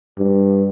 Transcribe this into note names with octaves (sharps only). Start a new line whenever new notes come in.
G2